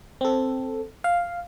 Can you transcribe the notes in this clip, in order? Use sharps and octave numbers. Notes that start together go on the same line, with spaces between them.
C4 A4
F5